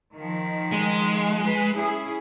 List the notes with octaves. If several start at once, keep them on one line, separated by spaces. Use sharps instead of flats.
D#3 F3
G#3
B4
C#4 E4 G#4